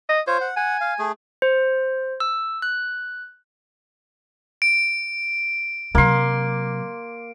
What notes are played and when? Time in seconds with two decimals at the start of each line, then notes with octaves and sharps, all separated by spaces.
0.09 D#5
0.27 F4 C5 C#5
0.41 F#5
0.56 F#5 G#5
0.81 F5
0.99 A3 G#4
1.42 C5
2.20 E6
2.62 F#6
4.62 D7
5.95 C3 F#3 A#3 C6